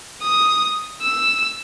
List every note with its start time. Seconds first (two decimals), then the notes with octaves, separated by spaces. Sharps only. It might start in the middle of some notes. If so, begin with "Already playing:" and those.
0.23 D#6
1.03 E6